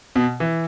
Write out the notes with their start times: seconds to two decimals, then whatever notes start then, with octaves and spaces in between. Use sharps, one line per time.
0.16 B2
0.40 E3